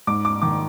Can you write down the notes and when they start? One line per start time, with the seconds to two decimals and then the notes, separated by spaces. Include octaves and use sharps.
0.07 G#2 D6
0.25 D6
0.42 D#3 D6